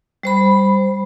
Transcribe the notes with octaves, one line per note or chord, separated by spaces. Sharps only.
G3 C5 B5